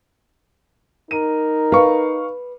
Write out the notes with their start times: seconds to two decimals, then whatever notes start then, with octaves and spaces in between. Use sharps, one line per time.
1.11 D#4 A#4 D#7
1.72 B4 F5 C#6